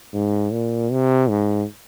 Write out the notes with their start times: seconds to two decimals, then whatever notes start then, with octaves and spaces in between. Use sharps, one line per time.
0.14 G#2
0.52 A#2
0.91 C3
1.29 G#2